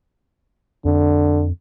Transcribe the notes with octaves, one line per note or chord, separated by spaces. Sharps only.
F2 D3